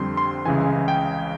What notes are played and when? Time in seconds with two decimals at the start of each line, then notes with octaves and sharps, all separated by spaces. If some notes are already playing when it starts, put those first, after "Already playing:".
Already playing: F2 D3 G3 C4 C6
0.17 C6
0.46 C#2 C#3 E3 G#5
0.88 G5